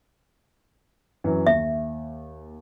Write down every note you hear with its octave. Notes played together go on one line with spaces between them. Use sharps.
F#2 E3 F#3
D#2 E5